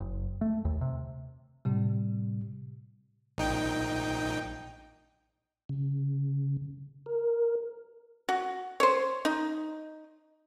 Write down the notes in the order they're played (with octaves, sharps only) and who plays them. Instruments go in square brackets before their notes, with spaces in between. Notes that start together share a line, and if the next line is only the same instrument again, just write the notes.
[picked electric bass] F#1
A3
D#2
C3
[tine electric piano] A2 C3 G3
[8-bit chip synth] A#1 D#4 G5
[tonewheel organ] C#3
A#4
[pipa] F#4
C5 C#5
D#4